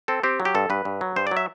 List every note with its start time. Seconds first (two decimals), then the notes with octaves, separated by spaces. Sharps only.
0.08 C4 A4
0.24 C4 G4
0.40 F#3
0.45 G4
0.55 G2 A4
0.70 G2 B4
0.85 G2
1.01 F#3
1.16 G2 C5
1.27 D5
1.31 F#3
1.37 E5